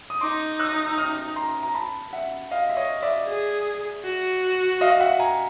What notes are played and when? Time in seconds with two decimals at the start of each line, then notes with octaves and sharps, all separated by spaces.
0.10 D#6
0.21 D#4 C6 D6
0.59 E6 F#6
0.87 E6
0.98 D#6 F6
1.36 A#5 C6
1.63 A#5
1.74 A5 B5
2.13 E5 F#5
2.51 D#5 F5
2.69 E5
2.77 C#5 D#5
3.02 D5 E5
3.27 G#4
4.05 F#4
4.81 D#5 F5
4.91 F5
5.00 E5 F#5
5.20 G#5 A#5